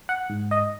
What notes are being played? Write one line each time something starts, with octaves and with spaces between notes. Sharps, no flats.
F#5
G#2
D#5